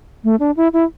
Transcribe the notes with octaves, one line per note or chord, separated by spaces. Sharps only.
A3
D4
E4
E4